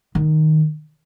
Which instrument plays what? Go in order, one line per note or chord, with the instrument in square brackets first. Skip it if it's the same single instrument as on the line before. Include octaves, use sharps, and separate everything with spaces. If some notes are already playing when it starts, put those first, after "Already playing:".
[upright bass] D#3